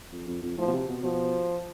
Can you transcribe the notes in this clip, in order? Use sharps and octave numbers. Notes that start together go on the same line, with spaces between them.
F2
F2
F2
A2 F3
B2
C3
B2
B2 F3